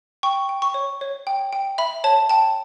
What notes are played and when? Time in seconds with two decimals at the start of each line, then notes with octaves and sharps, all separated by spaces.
0.23 G5 C#6
0.49 G5
0.62 C#6
0.74 C#5
1.01 C#5
1.27 G5
1.53 G5
1.78 E5 B5
2.04 C#5 A5
2.29 G5 A5